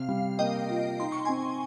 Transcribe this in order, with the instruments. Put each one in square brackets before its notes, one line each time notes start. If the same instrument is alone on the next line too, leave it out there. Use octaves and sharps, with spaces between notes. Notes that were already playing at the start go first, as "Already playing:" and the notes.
Already playing: [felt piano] C3 [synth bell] F5
[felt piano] G3
[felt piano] A#3 [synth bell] D#5 G5
[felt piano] F4
[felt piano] D#4 [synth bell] C6
[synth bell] C#6
[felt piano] C4 [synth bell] G#5 C6